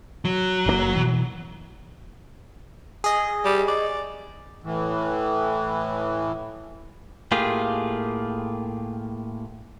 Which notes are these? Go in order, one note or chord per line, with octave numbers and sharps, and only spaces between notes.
F#3
F#1 C3 A#3
B2 E3
G#4 D#5
G3
D5
A2 E3
A2 A#3 F4 G4 G#4